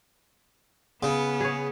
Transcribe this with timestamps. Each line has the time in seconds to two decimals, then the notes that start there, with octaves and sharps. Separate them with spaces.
1.03 C#3 B3
1.41 G#4 C#5